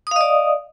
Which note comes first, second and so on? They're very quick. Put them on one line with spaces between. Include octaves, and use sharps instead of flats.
D#6 F5 D#5 D5